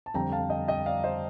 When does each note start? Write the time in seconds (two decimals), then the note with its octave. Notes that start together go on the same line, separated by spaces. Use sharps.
0.06 A5
0.14 F2 D3 G3 C4 G5 A#5
0.32 F5 A5
0.50 D#5 G5
0.68 D#5 G5
0.86 D5 F5
1.04 C5 D#5